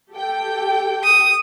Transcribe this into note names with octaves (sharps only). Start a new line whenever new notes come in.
G4 A4 G5
D#6